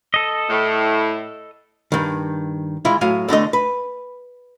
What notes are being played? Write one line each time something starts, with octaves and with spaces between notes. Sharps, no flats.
A4 D#5
A2
G2 D#3
E3 G#3 E4 F4
A2 F#3 F5 G#5
E2 D3 A3 D#5
B4